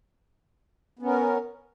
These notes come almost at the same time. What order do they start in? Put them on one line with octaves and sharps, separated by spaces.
B3 C#4 A#4